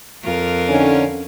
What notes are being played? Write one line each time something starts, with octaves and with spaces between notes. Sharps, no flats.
F2 F4 A#4
D3 C#4 D#4